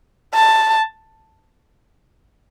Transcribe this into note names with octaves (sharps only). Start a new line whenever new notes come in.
A5